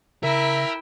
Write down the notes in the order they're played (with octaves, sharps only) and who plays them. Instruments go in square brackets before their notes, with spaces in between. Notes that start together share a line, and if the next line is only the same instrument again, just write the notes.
[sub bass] C#3 [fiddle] E4 G5 [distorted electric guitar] A#4 [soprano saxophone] E5